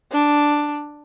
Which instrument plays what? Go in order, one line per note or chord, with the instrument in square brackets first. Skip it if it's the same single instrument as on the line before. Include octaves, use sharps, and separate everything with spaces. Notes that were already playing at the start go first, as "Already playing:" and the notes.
[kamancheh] D4